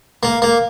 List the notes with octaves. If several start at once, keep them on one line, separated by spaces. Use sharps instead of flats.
A#3
A#3